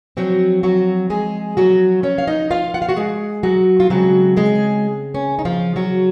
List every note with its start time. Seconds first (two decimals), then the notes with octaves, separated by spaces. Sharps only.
0.17 F3 F#3 C4 F#4
0.63 F#3 F#4
1.10 G#3 G#4
1.57 F#3 F#4
2.03 C#4 C#5
2.18 F5
2.27 D#4 D#5
2.51 F4 F5
2.74 F#5
2.82 F5
2.89 F#4 F#5
2.97 G#3 G#4
3.43 F#3 F#4
3.80 F4
3.90 C#3 F#3 G#3 C4 F#4
4.37 G#3 G#4
5.15 C#4
5.39 D#4
5.45 F3 F4
5.76 F#3 F#4